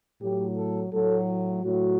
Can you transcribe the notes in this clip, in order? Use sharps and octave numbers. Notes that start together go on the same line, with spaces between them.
A2 F#3 G4
A4
A2 F#3 A4
A2 F#3 F#4